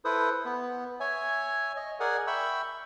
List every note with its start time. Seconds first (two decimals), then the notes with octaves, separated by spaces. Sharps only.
0.05 E4 A4 B4 C5 D#6
0.45 B3
1.00 C#5 E5 G#5
1.76 D#5
2.00 G#4 A#4 D5 F#5 G#5
2.27 E5 G5 B5 C#6 E6